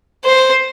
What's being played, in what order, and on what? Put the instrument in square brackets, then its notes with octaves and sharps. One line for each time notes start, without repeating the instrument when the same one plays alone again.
[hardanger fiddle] C5